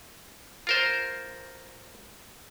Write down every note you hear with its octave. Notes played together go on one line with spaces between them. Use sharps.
F4 A#4 C5